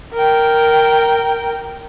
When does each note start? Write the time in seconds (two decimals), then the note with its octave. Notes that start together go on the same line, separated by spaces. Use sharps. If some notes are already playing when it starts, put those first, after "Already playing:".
0.14 A#4 G5